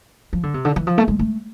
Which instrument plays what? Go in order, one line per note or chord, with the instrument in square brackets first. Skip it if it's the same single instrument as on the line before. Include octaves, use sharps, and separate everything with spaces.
[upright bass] F3
D3
C3
D3
E3
F3
A3
G#3
A3